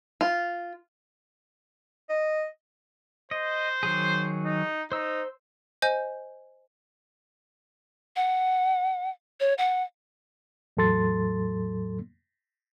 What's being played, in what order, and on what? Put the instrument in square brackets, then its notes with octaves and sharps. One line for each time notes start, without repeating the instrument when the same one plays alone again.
[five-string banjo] F4
[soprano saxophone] D#5
[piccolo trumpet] C5 [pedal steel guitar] D#5
[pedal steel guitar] D#3 F#3 G#4
[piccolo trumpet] D#4
[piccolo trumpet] D#4 [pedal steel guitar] C5 E6
[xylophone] C5 D#5 G#5 G6
[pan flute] F#5
C#5
F#5
[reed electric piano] E2 A2 F#3 A4 C6 A6